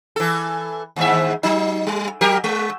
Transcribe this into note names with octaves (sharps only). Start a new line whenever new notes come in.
E3 A4
D#2 G#2 E5
F#3 D#4
G3
F#3 G4 A#4
G#3